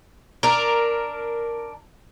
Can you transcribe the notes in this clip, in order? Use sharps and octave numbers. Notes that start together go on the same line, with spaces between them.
D4 A#4